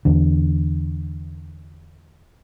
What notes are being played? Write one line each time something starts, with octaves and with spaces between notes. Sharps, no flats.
E2 D3